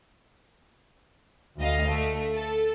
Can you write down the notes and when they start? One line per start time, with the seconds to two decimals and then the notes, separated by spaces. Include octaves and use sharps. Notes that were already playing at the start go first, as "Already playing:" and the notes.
1.58 D2 D#5 F5
1.87 A3
2.33 A4